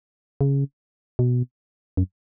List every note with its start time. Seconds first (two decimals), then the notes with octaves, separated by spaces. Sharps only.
0.41 C#3
1.19 B2
1.97 F#2